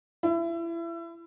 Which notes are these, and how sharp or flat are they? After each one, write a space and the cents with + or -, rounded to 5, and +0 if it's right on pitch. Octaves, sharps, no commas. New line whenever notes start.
E4 +30